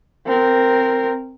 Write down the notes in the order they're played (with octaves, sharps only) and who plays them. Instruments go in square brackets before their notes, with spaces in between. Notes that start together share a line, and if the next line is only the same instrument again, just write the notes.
[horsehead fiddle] C4 A#4